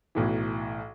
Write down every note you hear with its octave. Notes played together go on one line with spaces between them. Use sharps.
B1 A2 E3